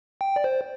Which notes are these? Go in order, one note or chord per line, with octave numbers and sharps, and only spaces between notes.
G5
D5
C5